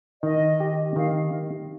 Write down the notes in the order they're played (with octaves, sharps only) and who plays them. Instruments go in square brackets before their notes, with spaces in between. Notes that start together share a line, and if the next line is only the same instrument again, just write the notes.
[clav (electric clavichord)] D#3 [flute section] D#5
[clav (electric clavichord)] G4
[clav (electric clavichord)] D#3 [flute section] F5